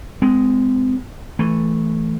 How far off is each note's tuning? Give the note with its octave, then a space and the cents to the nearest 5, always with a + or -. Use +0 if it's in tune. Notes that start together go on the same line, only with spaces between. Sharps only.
G#3 +0 C4 -35
E3 +0 A3 +0